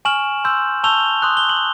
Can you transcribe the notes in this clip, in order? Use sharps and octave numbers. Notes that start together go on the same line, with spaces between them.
G#5 C#6 F6 E7 F#7
C6 E6 G6
A5 C#6 E6 G6 F7 G7
C6 D#6 F#6
G7
F#7